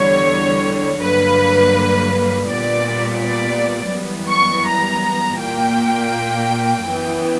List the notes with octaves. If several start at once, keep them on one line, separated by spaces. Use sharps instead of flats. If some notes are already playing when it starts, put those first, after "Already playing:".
Already playing: E2 D3 G3 C#5
G2 D3 F#3 A#3 B4
A#2 G3 B3 D5
D5
F#2 E3 G3 B3
C#6
A#5
A#2 A#3 G5
F#2 E3 B3